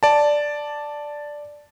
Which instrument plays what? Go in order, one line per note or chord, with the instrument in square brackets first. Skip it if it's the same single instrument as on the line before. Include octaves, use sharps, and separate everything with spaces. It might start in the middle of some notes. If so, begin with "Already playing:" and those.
[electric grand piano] D5 A5